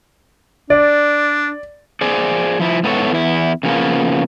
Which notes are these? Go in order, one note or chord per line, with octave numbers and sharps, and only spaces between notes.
D4 D5
G#4 C5 D5
F3 E4
G#2 B3 E4 G#4 A4 C#5
E2 E4
C#3 F3 A#3 B3